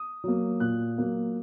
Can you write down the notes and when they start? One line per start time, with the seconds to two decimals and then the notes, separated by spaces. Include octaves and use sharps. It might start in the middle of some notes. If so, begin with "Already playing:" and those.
Already playing: D#6
0.24 F#3 A#3
0.60 A#2 F#6
0.98 F#3 A#3